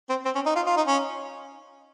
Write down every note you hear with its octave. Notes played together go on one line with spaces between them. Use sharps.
C4
C4
C#4
D#4
F4
F4
D#4
C#4